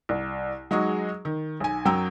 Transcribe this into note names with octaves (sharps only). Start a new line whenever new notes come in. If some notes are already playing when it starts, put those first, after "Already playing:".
C2
F#3 G#3 D#4 F#4 G#4
D#3
B1 G#5
F#2 F#3 G5 A#5 E6